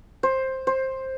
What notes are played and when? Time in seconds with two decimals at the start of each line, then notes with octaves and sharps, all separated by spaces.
0.23 C5
0.67 C5